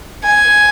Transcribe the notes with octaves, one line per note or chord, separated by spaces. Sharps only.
G#5